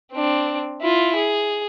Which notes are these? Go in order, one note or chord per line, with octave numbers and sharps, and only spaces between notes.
C4 D4
E4 F4
G#4